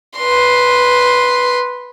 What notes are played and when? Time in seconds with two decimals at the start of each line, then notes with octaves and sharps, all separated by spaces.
0.18 B4 C6